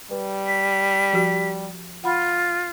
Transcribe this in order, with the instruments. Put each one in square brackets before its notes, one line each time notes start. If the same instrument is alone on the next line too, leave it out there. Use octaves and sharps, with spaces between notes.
[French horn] G3 [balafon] B4
[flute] B6
[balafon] F3 F#4 G4
[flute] F4 [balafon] F#5 B5